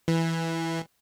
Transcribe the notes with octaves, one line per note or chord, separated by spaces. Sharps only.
E3